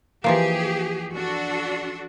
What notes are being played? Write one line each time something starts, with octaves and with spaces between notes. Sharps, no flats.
E3 F3 A#3 G4 G#4
D4 F#4 A4